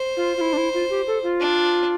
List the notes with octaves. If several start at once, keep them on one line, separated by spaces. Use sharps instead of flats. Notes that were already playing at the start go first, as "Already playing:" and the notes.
Already playing: C5
F4
F4
E4
D4
E4
F4
G4
A4
F4
D4